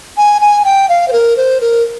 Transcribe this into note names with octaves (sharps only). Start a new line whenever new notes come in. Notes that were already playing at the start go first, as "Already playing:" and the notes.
G#5
G#5
G5
F5
C5
A#4
C5
A#4